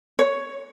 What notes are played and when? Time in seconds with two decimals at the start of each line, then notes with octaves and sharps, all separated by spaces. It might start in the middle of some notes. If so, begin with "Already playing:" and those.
0.19 C#5